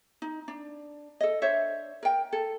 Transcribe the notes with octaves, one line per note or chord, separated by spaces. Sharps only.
D#4
D4
A4 D#5
D4 C5 C#5 E5
A#4 G5
A4